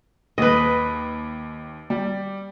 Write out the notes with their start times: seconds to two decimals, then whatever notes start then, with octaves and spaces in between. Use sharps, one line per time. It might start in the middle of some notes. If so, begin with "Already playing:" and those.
0.38 D#2 B4 D#5
1.90 G3